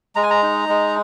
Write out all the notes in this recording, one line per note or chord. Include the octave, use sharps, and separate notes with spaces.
G#3 A#5
G#5
A#5
D#4
G#3